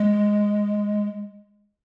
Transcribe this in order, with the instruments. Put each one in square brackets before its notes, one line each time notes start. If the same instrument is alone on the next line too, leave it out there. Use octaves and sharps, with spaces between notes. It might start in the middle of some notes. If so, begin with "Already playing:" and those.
Already playing: [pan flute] G#3